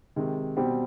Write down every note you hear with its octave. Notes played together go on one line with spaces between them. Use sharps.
C3 D#3 G#3
B2 G3 C4 G4